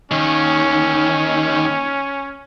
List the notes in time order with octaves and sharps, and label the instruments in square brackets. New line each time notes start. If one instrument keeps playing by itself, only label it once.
[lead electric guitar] D#2 D#3 [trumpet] C#4